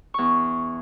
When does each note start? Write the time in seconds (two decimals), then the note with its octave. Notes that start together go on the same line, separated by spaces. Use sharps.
0.14 E2 C#6